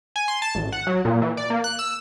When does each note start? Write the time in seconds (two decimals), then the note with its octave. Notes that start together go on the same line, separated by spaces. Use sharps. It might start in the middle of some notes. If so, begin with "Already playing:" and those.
0.16 G#5
0.28 C6
0.42 A5
0.55 A1
0.72 F#5
0.87 F#3
1.05 A#2
1.22 E3
1.37 D5
1.50 A#3
1.64 F#6
1.79 E6